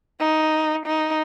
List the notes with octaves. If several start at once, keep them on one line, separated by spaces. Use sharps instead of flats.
D#4
D#4